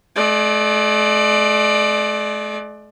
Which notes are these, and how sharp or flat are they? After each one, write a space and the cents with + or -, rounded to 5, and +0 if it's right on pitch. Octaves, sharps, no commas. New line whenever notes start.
A3 -45 D5 +20